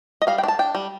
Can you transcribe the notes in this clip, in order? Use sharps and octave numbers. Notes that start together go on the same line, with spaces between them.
D#5
G3 F5
G5
D4
A5
D4 G5
G3